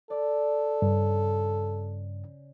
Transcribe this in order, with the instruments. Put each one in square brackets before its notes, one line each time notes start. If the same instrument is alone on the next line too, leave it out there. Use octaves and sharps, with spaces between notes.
[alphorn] A4 [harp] D5
[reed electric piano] G2 [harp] C#3